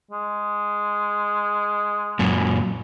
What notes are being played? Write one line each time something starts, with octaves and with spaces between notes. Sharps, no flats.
G#3
F#2 A#2